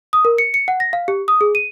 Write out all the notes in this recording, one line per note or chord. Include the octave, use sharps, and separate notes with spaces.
D#6
A#4
C#7
C#7
F#5
A#6
F5
G4
D#6
G#4
D#7